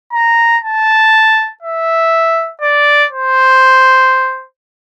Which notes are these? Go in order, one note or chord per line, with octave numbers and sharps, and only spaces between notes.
A#5
A5
E5
D5
C5